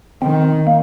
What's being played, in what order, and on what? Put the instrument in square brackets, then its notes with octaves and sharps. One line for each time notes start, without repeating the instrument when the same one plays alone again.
[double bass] D#3 [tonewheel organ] C4
[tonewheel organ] A#3